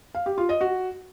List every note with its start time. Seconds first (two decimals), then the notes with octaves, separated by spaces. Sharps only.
0.15 F5
0.26 G4
0.38 F4
0.49 D#5
0.61 F#4